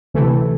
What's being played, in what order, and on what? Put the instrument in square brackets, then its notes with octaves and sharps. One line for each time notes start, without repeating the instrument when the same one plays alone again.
[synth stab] D2 C3 E3 A3